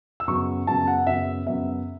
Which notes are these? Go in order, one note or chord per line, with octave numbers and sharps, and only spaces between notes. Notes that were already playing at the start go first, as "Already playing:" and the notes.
E6
F#2 C#3 F#3 B3 C#6
F#2 C#3 F#3 B3 A5
F#5
F#2 C#3 F#3 B3 E5
F#2 C#3 F#3 B3 E5